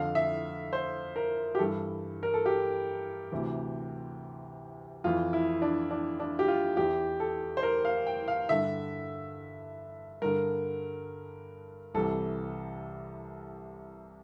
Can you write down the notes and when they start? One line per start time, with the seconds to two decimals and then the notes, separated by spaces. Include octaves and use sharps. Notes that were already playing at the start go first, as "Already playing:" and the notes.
Already playing: F2 D3 F5
0.15 E5
0.73 C5
1.16 A#4
1.55 G4
1.59 G2 E3 A4
2.23 A#4
2.34 A4
2.46 G4
3.32 D2 C3 E3
5.04 F2 E3 F4
5.33 E4
5.62 D4
5.90 D4
6.20 D4
6.39 G4
6.48 F4
6.77 E2 E3 G4
7.20 A4
7.57 C5
7.63 A#4
7.85 F5
8.07 G5
8.28 F5
8.49 G2 D3 E5
10.22 G2 D3 A#4
11.94 C2 C3 E3 A4